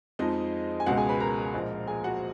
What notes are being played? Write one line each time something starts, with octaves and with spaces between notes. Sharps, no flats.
F2 F3 G#3 D#4 D#5
G#5
C#2 B2 G#3 F#4 F#5
G#4 G#5
B4 B5
A#4 A#5
A#1 A#2 F3 G#3
G#4 G#5
F#4 F#5